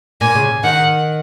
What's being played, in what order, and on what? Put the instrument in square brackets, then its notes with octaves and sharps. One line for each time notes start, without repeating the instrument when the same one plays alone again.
[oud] A#2 [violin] G#5
[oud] C#3
[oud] D#3 [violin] F#5